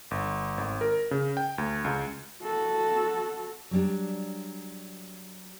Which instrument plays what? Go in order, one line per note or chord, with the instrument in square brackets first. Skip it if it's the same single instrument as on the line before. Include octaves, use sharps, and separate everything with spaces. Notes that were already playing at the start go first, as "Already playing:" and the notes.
[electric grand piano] G1
G#1
A#4
C#3
G5
D2
C#2
[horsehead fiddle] F#4 A4
[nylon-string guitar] F#3 G3 D4